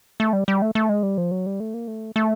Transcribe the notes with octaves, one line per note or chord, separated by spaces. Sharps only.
A3
G3
G3
A3
A3
G#3
G3
F3
F#3
G3
A3
A#3
A3
A3